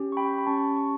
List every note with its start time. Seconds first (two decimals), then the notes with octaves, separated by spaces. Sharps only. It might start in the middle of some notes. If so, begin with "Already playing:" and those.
Already playing: C#4 G4
0.12 C#6
0.17 G5 B5
0.38 B5
0.46 C#4 G4 A5 C#6
0.76 A5 C#6